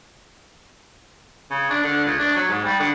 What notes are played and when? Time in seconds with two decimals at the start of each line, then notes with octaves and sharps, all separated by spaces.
1.51 C#3
1.70 D4
1.84 D3
2.05 C#2
2.19 D4
2.36 F#3
2.49 G#2
2.65 G3
2.80 D3